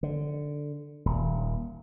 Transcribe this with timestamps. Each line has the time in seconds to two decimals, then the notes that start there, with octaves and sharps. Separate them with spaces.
0.03 D3
1.06 D#1